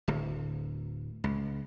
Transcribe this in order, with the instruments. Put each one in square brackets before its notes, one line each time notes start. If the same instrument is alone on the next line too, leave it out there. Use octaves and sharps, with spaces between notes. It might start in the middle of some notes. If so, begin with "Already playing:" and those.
[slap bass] D1 D2
C#2